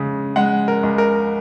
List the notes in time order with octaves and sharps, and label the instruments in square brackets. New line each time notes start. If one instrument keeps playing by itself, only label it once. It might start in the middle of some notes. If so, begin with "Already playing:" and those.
Already playing: [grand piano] C#3 G#3
G#3 F#5
A#4
C#2
A#4